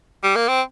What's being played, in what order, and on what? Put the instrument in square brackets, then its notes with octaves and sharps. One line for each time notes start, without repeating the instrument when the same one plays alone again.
[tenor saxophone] G3
A#3
C4